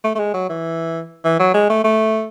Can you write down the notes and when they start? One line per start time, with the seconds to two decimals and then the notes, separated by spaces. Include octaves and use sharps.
0.04 A3
0.15 A3
0.19 G#3
0.34 F#3
0.49 E3
1.25 E3
1.40 F#3
1.54 G#3
1.70 A3
1.84 A3